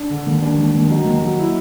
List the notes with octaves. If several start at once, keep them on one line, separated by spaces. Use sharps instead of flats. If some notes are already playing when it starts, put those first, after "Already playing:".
Already playing: D4
D3
D#2
D#2 D4
D#2
D#2
F#3 D#4
D#2
F#3
E4